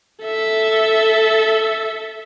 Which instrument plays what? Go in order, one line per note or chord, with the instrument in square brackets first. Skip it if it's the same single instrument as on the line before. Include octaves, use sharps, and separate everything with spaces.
[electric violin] A4 E5